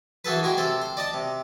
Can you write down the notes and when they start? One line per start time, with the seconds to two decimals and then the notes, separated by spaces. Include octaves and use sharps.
0.25 E3 F#4 G#4 A4 B4
0.43 G#3 F#4 G#4 G5
0.57 C3 A4 C5
0.81 C5
0.97 D5 D#5 A5
1.14 C3